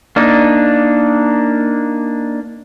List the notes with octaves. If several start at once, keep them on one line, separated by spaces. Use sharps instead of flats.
A#3 D4 D#4